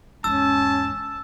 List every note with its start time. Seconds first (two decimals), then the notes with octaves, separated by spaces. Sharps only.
0.24 E2 G#2 C#4 A5 E6